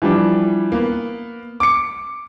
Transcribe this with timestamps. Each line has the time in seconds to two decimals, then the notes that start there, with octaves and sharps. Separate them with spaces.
0.02 E3 F3 G3 D4
0.72 A#3 B3
1.60 D6 C#7